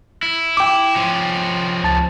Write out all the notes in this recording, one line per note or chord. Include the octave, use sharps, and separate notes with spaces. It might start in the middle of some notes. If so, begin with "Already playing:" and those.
E4
G5 D6
F3 C#4
C#2 A5 A6